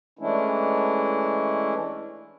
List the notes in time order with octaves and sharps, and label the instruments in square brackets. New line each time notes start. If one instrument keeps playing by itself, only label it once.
[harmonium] E3 G#3 A3 C#4 D4 E4